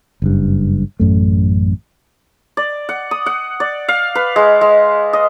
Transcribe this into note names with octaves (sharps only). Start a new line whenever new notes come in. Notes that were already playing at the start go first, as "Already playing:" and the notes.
F#1 G2
A1 F#2 A3
D5
F#5
D#6
F#5
D5
F5
B4
G#3
G#3
D#5